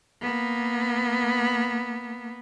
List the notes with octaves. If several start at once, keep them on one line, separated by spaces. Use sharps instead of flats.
A#3 B3